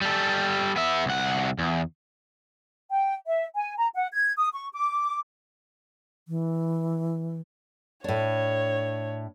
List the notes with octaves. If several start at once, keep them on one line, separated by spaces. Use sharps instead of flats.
G3 A4
B3 E5
C2 F#5
E2
G5
E5
G#5
A#5
F#5
G#6
D#6
C#6
D6
E3
A2 D4 C#5